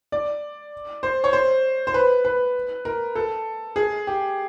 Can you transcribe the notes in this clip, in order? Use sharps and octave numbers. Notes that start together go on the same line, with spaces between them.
D5
C5
C#5
C5
C5
B4
B4
A#4
A4
G#4
G4